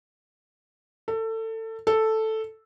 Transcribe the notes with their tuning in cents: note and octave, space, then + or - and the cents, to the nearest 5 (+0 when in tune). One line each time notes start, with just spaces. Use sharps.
A4 +25
A4 +0